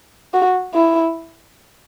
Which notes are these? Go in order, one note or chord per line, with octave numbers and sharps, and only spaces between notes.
F#4
E4